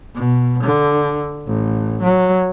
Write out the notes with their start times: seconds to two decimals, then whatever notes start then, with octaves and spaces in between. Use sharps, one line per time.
0.15 B2
0.64 D3
1.47 A1
2.03 F#3